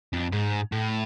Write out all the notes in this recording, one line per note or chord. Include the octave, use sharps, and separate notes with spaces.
F2
G#2
A2